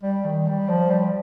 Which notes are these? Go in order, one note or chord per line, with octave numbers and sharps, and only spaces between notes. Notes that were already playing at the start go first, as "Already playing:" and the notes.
G3
D#3
G3
F3
G3